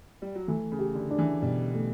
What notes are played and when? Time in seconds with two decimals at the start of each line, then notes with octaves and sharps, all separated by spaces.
0.22 G3
0.35 F#3
0.48 E3 A3
0.72 C#3
0.79 G4
0.95 D3
1.11 D4
1.19 E3
1.42 B2 G3
1.74 A3